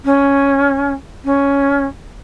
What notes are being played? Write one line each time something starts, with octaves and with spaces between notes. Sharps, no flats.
C#4
C#4